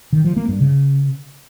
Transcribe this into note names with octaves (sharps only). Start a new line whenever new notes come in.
D#3
F3
A#3
G2
C#3